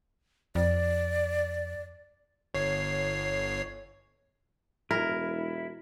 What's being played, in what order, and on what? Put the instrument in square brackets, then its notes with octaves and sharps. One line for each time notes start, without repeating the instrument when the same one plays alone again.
[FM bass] F2 [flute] D5
[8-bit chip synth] G1 C#5 C7
[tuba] E1 [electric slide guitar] E4 [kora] A#4